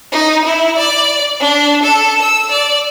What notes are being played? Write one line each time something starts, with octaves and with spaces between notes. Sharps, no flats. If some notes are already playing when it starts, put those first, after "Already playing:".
D#4
E4
D5
D4
A4
E6
D5